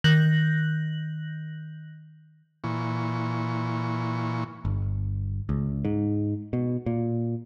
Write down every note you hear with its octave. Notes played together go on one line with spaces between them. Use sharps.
D#3 F#6 G6 A#6 F#7
A#2 E3 C#6
G1
C#2
G#2
B2
A#2